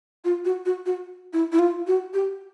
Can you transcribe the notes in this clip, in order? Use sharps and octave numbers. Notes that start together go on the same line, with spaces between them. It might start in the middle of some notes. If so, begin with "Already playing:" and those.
F4
F#4
F#4
F#4
E4
E4
F4
F#4
G4